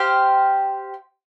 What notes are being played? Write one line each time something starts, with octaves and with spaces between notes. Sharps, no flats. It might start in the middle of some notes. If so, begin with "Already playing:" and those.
Already playing: G4 C5 F5